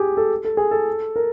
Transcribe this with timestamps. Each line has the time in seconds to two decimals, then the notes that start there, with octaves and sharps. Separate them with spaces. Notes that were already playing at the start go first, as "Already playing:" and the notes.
Already playing: G4 G#4
0.17 A4
0.45 A4
0.57 G#4
0.71 A4
1.16 A#4